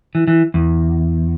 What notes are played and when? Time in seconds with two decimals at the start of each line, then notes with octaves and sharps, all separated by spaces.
0.15 E3
0.28 E3
0.54 E2